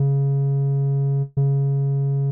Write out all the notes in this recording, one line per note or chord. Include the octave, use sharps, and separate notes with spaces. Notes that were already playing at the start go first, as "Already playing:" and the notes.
Already playing: C#3
C#3